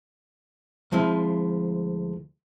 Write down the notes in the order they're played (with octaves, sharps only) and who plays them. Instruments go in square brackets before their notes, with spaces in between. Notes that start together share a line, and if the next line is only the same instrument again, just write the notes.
[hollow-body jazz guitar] D2 F3 G#3 C4 E4